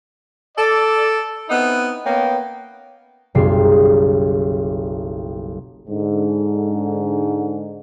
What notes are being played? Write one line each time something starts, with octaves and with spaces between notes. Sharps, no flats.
A4 D5
B3 C4 D#4 E4
A#3 B3 C#4 G5
F#1 B1 G3 C7
G#2 D3